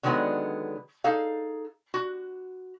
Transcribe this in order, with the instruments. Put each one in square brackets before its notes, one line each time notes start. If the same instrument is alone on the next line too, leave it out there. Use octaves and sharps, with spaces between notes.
[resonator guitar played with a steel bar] D3 D#3 F#3 G#3 B3
D#4 G#4 A4 F5
F#4